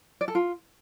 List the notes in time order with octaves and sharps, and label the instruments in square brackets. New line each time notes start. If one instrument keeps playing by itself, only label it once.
[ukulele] D5
A4
F4